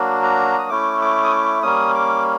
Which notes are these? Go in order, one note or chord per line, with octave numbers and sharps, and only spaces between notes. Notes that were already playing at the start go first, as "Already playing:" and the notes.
Already playing: F#3 A#3 D4 F#4
A#5
D#6
A3 C#4 E4 D6
D6
D#6
D6
G3 A#3 C#4 D#6
D6